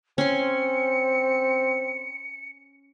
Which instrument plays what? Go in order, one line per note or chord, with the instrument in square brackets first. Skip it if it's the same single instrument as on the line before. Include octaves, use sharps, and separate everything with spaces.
[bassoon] C4 [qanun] C#4 C6 [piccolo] C#7